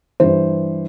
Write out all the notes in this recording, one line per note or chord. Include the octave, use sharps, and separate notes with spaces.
G2 E3 C5